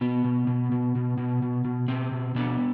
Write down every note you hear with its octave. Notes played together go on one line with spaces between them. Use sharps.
B2 B3
B2
B2
B2
B2
B2
B2
B2
B2 C4
B2
B2 B3 D4